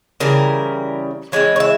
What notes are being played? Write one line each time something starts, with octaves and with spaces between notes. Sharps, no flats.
C#3 E3 G3 A#4
E3 G#3 C4 C#5
C#5
E5